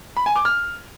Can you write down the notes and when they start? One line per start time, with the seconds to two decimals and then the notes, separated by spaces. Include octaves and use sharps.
0.17 B5
0.26 G#5
0.36 D6
0.45 F6